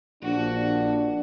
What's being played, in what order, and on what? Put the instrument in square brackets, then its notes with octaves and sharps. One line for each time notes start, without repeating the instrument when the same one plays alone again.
[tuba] A#1 [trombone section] F3 D4 [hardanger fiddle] F#4